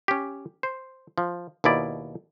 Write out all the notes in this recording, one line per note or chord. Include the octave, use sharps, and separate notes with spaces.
C#4 G4
C5
F3
D#2 B2 E4 D5